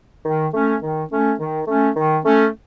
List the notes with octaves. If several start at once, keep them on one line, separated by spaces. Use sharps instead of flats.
D#3
A3 C#4
D#3
A3 C#4
D#3
A3 C#4
D#3
A3 C#4